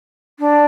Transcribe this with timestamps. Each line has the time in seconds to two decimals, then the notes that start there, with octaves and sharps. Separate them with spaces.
0.40 D4